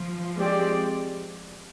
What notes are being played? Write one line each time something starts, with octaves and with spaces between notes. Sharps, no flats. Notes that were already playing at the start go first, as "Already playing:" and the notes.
Already playing: F3
G#3 C4 G4 D5